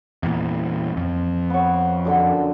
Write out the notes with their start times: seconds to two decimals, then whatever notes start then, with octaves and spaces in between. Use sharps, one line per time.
0.23 E2 A#2
0.97 F2
1.50 B3 C#5
2.05 F#2 D3 G5